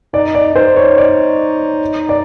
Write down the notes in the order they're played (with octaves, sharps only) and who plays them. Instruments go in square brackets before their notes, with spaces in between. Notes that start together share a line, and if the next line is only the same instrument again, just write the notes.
[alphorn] D#4 [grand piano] D5
[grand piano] D5
[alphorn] D#4 [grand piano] C5
[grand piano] C#5
D5
D5